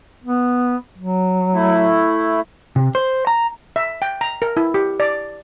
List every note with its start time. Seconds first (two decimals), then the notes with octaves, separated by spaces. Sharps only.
0.24 B3
0.98 F#3
1.53 A3 E4
2.76 C3
2.95 C5
3.27 A#5
3.76 E5
4.02 G5
4.21 A#5
4.42 A#4
4.57 E4
4.74 G4
5.00 D5